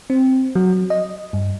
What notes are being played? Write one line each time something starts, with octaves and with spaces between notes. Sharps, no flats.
C4
F#3
D#5
G2